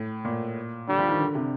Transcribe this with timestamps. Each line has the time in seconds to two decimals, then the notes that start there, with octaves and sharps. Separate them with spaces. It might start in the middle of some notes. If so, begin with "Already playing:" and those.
Already playing: A2
0.25 A#2
0.88 D3 G3
0.99 F3
1.09 D#3
1.20 D3
1.35 C3